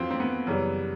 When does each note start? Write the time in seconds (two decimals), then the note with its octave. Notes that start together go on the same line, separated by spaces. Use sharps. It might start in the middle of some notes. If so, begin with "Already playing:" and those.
Already playing: F2 E3 C4 F4 F#4
0.10 C4
0.20 B3
0.47 F#2 C#3 E3 G3